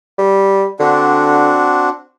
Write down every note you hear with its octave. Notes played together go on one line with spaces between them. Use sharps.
G3
D3 C4 D4 F#4